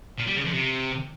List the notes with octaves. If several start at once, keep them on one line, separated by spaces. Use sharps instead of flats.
A#2
G3
C#3
F2
C3